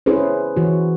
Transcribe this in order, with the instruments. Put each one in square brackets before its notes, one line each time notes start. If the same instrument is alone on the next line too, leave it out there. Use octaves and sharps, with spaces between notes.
[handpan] C#4 E4 G#4 B4 C5
E3 F#4